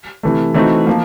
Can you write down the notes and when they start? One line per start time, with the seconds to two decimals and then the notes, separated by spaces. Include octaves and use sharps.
0.23 C3 E3 A3
0.54 E3 A3 C4 D#4 F#4
0.87 F3 A#3